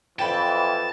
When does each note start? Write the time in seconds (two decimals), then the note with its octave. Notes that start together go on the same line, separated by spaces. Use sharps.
0.19 F2 E3 G5 A5 B5